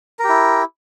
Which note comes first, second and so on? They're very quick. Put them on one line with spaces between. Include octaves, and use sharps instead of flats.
A#4 G4 E4